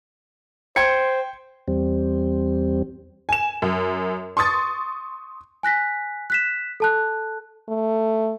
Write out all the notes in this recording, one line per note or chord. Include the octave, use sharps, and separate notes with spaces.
C5 G5 G#6 C#7
E2 G3 C4
G#5 E7
F#2
C6 C#6 D#6 A6
G#5 F#6 A#6 B6
F#6 B6 E7
A4 A5 F#6
A3